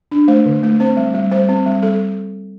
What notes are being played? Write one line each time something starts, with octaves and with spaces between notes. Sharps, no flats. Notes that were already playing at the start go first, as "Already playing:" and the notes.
D4
A3 C5
D3
A3
C4 C5
G3
G3
G3 C5
C4
G3
G3 A4